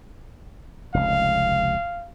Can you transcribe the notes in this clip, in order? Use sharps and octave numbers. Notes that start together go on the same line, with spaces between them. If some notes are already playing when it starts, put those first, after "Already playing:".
F1 C#2 F5